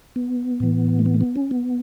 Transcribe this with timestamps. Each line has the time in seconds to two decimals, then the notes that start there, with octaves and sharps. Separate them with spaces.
0.16 B3
0.60 A2 E3
0.99 A3
1.06 B3
1.14 A3
1.21 B3
1.36 C#4
1.51 B3